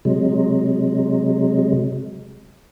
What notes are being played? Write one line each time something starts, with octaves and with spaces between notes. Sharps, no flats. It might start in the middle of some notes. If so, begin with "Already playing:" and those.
C3 F#3 G#3